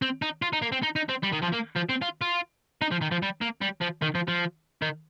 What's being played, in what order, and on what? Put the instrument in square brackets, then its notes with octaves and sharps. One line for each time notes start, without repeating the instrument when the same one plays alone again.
[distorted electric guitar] C4
D#4
F4
D#4
A#3
C4
D#4
D#4
C4
G3
D#3
F3
A#3
F3
C4
F4
F4
D#4
F3
D#3
F3
G3
A#3
G3
F3
D#3
F3
F3
D#3